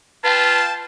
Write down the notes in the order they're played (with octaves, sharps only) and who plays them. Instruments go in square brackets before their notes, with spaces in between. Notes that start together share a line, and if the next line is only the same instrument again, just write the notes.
[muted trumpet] F4 [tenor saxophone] B4 [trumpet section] F5 G5 A5